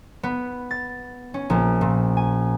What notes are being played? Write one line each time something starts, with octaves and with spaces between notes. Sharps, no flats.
B3
A6
C#4
A#1
A#2
G#5